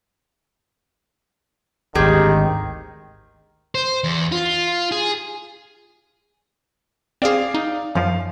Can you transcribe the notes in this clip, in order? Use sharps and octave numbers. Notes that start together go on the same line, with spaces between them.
G#1 D2 D#3 G4 G#4
C5
E2
F4
G#4
C4 G#4 D5 F5
D#4
F#2 F3 F5